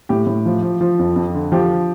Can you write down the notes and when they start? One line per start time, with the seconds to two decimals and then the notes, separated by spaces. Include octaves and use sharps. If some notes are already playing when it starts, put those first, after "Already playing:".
0.09 A2 G4
0.27 A2
0.46 F3
0.62 F3
0.81 F3
0.99 F2
1.16 F2
1.34 D3
1.52 F3 G4